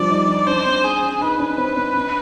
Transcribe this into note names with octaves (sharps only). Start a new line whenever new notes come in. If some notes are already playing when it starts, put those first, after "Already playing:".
Already playing: F3 G3 D4 D5
D#4
D#4
D4 C5
C4
G#4
D4
D#4 B4
D4
C4
C4
D4